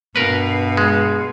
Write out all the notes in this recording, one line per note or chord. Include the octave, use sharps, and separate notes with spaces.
G2 B2 A#4 B4
G#3